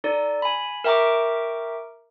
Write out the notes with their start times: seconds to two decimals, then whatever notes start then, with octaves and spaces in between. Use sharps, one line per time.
0.04 D#4 A4 D5
0.42 G#5 B5
0.84 A#4 E5 G5 A#5 C#6 D6